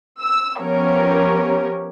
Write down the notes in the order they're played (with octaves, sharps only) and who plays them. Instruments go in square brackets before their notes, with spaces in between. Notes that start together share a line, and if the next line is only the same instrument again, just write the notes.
[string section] E6
F3 B3 C#4 G4 A#4 C#5